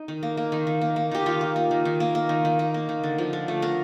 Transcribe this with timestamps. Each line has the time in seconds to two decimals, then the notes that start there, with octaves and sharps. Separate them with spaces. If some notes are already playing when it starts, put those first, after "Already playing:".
Already playing: D#4
0.08 D#3
0.23 A#3
0.37 A#3
0.52 D#3
0.67 D#3
0.81 A#3
0.96 A#3
1.11 D#3 G4
1.26 D#3 F4
1.41 A#3
1.56 A#3
1.71 D#3
1.85 D#3
2.00 A#3
2.15 A#3
2.29 D#3
2.45 D#3
2.59 A#3
2.74 A#3
2.89 D#3
3.03 D3
3.18 F3
3.33 D3
3.48 A3
3.62 D3 A#4